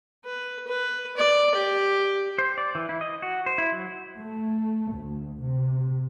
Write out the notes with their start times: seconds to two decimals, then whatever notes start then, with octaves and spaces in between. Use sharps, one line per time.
0.24 B4
0.67 B4
1.17 D5
1.55 G4
2.38 C5
2.58 D5
2.75 E3
2.89 E4
3.01 D#5
3.22 F#4
3.46 C5
3.58 E4
3.72 F#3
4.18 A3
4.94 D2
5.41 C3